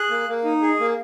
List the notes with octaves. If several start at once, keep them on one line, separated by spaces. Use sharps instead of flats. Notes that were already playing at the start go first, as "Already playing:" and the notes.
Already playing: G#4 F#6
A#3
A#3
D#4
G#4
A#3